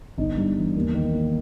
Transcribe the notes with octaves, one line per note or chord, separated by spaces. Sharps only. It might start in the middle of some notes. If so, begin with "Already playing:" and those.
G1 D#4
G2
E3
D#2
D#3
A#3